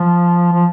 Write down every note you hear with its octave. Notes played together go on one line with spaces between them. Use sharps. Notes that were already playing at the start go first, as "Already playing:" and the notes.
Already playing: F3
F3